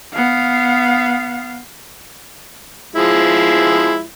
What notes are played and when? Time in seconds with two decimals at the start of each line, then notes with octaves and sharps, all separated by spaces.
0.14 B3 F5
2.96 F3 G#3 E4